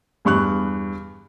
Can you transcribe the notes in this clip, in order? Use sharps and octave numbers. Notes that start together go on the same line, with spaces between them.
E2 G2 C#6 F#6